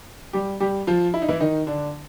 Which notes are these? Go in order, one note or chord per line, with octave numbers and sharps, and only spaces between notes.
G3 G4
G3 G4
F3 F4
E4
D#4
E3 E4
D#3 D#4
D3 D4